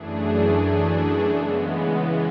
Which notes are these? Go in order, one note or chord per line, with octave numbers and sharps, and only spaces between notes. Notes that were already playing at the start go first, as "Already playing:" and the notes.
Already playing: F#2 E3 A3 D4 G#4
C#3 E3 G#3 B3